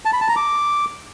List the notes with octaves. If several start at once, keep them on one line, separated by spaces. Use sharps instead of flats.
A5
B5
A5
A#5
D6